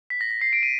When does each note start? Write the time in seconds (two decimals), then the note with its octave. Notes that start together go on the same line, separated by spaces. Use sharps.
0.10 B6
0.21 A#6
0.31 B6
0.41 C7
0.53 D7
0.63 D#7